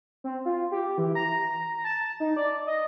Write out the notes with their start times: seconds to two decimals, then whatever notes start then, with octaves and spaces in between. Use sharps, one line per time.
0.24 C4
0.45 F4
0.72 G4
0.98 E3
1.15 A#5
1.84 A5
2.20 D#4
2.36 D5
2.67 D#5